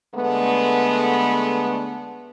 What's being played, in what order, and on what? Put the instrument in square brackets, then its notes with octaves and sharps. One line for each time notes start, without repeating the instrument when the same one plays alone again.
[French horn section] D3 G#3 A3 B3